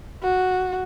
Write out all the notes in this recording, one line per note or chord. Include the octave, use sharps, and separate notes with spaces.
F#4